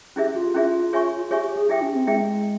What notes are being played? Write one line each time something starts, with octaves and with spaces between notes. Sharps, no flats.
C#4 E4 G4 G#4 E5
F4
C#4 E4 G#4 E5
G#4 C#5 E5 G#5 C#6
G4 G#4 C#5 E5 G#5 C#6
G4
G#4
E4 G4 G#4 E5 G5
C#4
C4
G#3 E4 G#4 E5 G5